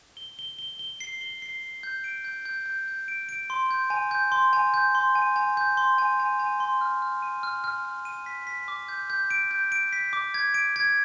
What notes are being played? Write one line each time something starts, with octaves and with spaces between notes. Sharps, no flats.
G7
G7
G7
G7
C7
G7
C7
C7
G6
D7
G6
G6
G6
G6
D7
D7
C6
G6
G#5
G6
C6
G#5
G6
C6
G#5
G#5
G6
C6
G#5
G#5
G#5
C6
F6
F6
D#7
F6
F6
F6
D#7
B6
B6
D6
G6
G6
D7
G6
D7
B6
D6
G#6
D7
G#6